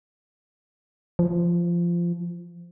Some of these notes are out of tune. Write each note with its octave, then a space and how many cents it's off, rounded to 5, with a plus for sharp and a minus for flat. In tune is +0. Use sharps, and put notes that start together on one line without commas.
F3 -15